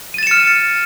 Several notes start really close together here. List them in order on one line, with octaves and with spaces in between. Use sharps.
D#7 A6 E7 C#7 F6